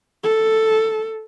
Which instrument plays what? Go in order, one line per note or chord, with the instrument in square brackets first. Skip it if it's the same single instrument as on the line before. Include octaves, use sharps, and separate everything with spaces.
[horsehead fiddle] A4